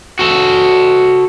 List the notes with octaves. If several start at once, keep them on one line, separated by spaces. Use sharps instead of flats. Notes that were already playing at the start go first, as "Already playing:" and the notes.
F#4 A4